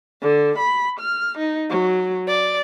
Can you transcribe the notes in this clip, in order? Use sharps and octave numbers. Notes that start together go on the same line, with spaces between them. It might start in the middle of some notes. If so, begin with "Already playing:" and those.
D3
B5
F6
D#4
F#3
D5